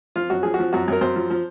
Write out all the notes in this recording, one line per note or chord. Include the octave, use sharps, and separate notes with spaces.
F3 F4
F#2 F#4
F3 G#4
F#4
F3
F#2 F#4
F#2
A#4
F#2 C5
F3
F3